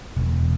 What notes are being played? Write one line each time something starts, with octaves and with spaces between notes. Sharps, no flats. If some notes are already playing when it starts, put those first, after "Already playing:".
E1